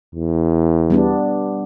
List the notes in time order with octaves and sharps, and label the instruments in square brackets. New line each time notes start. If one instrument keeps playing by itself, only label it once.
[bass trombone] E2
[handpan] G3 B3 D4